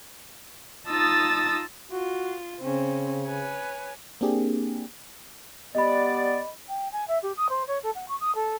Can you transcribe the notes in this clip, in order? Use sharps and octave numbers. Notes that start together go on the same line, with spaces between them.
D#4 F4 A5 D#6 E6 A6
F4 F#4
C#3 C4 C#4
B4 C#5 G#5
A#3 C4 D4 G4 G#4
G3 B3 D5 D#5 B5
G5
G#5
E5
G4
D#6
C5
C#5
A4
F#5
C#6
D#6
A4